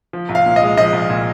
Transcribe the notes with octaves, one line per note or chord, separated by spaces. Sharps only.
F3
C2
F5
A#2
D#5
G#3
F3 D#5
C2
A#2